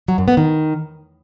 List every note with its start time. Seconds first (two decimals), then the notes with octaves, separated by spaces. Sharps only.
0.08 F#3
0.18 F#2
0.28 B3
0.37 D#3